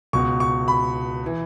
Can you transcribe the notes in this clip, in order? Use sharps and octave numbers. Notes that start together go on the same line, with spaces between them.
C#2 B2 C#6
C#6
B5
E3